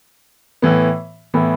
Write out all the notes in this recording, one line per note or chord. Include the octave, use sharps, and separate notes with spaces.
A2 E3 B3
A2 E3 B3